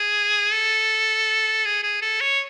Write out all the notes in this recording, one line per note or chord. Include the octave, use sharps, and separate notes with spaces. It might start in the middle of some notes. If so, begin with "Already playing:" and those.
Already playing: G#4
A4
G#4
G#4
A4
C#5